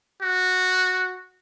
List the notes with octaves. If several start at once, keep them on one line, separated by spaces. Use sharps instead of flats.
F#4